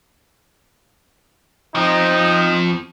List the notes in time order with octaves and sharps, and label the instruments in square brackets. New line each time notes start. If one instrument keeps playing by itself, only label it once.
[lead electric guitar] F3 C4 [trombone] D#4